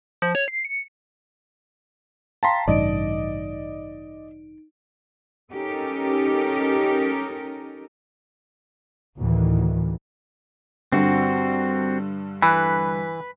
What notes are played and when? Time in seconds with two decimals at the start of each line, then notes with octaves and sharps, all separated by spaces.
0.22 F3
0.35 C#5
0.48 C7
0.65 C#7
2.43 F5 G5 A5 A#5 C6 B6
2.68 A1 G2 C#3 D#4 D5 D#5 D7
5.51 C#4 D#4 G4 A4 A#4
9.18 D2 A2 D#3 E3
10.92 G2 D3 C4 F#4
12.42 E3 B4